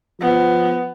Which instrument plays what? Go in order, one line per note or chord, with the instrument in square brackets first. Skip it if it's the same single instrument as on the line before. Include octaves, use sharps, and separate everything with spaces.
[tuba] F3 [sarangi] B3